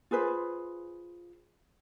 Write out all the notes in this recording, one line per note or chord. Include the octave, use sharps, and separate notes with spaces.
F4 G#4 B4 C5